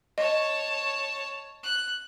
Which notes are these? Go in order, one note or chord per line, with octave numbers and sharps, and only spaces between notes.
C#5 D#5 A5
F#6